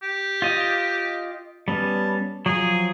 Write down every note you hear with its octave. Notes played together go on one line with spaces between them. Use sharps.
G4
F4 D#5 D#6
G3 B3 C#4 A5
F3 F#3 G#4